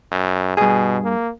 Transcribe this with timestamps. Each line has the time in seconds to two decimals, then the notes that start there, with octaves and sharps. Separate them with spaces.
0.12 F#2
0.57 G2 B2 G#4
1.04 A#3